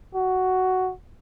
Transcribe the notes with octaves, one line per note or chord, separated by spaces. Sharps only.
F#4